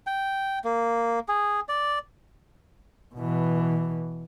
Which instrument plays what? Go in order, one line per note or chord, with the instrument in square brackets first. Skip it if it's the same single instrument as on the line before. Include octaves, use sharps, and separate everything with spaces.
[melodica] G5
A#3
G#4
D5
[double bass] B2 E3